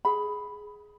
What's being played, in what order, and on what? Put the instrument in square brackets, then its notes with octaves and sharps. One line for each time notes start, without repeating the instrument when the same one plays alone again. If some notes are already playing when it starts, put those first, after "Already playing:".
[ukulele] G#4 B5